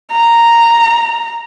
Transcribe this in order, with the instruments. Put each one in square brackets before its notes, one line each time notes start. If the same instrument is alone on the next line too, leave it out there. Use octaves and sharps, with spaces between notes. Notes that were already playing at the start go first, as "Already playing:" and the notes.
[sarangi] A#5